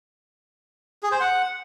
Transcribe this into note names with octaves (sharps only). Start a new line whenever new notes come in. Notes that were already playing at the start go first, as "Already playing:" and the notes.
G#4
C5
F#5